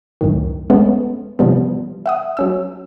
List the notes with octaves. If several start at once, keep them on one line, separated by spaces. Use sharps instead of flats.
C#2 F#2 A2 D#3
G#3 A3 B3 C#4
C3 E3 F3 G3 B3
E5 F#5 D#6
F#3 C#4 E6